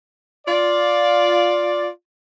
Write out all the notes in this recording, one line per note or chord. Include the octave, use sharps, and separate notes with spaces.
F4 D5